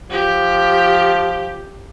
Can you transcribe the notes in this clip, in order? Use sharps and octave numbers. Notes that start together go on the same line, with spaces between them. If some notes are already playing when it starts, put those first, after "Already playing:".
F3 G4